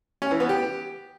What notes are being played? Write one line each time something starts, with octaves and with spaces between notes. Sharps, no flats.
C#4
E3
B3
G4